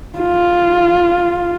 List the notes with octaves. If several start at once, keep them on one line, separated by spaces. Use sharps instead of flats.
F4